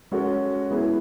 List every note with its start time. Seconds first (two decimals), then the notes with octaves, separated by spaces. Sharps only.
0.11 G#3 C#4 F#4 A4
0.70 G#3 B3 E4 G#4